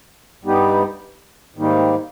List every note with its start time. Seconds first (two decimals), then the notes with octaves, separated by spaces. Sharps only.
0.43 G2 G3 B3 D#4 G4
1.56 G#2 D#3 G3 A#3 D#4